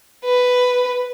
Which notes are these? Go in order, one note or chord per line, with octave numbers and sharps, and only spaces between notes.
B4